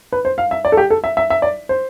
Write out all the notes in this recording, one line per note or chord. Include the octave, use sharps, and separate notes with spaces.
B4
C5
F5
E5
D5
A4
G4
A4
E5
E5
E5
D5
C5